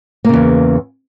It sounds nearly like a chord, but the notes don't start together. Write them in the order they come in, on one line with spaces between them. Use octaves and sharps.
A#3 C#3 E2